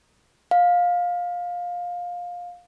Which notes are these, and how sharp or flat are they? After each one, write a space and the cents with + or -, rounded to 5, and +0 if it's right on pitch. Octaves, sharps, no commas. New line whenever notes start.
F5 +20